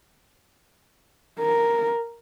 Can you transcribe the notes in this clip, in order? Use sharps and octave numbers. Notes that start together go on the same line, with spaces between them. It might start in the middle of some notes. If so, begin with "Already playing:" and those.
A#4